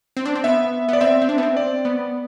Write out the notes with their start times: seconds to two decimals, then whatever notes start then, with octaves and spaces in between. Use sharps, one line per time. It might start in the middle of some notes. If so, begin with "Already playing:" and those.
0.17 C4
0.25 D4
0.35 C4
0.44 B3 E5
0.88 B3 D5
1.01 C4 E5
1.22 C4
1.29 D4
1.38 B3
1.43 C4
1.57 D5
1.85 B3